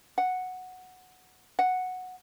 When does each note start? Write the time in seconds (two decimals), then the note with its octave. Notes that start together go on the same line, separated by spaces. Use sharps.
0.18 F#5
1.59 F#5